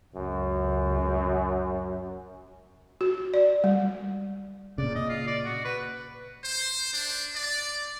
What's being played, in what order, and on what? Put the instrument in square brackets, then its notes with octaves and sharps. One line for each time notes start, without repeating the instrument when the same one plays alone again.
[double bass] C#2 [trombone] F#2
[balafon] F#4
D5
G3
[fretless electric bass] A#2 C#3 [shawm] D5
[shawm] D#5
F4
D5
F#4
B4
[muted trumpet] C5
D4
D5